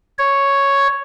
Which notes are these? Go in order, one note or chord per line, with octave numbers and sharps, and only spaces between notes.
C#5